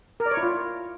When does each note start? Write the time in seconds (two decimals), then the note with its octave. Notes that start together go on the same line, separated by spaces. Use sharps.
0.20 A#4
0.26 D5
0.31 C#5
0.37 E4
0.43 F4